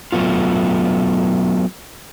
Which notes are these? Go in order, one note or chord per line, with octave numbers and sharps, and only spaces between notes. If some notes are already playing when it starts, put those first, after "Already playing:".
F#3 A3 B3 F4